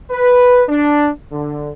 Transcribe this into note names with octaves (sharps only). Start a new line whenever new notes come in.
B4
D4
D3